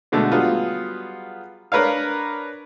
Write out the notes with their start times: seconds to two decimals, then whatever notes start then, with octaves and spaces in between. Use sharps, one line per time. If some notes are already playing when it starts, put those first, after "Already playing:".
0.12 B2 D3 G#3 A3
0.32 F#3 G3 B3 F4 G#4
1.72 D4 A#4 B4 C#5 F5